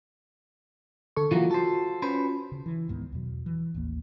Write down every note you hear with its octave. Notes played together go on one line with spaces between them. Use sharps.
D3 A4 C#6
E3 F#3 A#3 F4 F#4
A4 C5
C#4 B4 C5
C#3
E3
C#2 G#2 D#3 B3
E2 B2 F#3
E3
A1 D#2 A#3